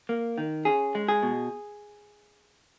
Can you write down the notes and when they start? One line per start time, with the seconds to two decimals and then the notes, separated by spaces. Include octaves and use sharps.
0.09 A#3
0.38 D#3
0.65 C#4 G#4
0.95 G#3
1.08 G#4
1.23 B2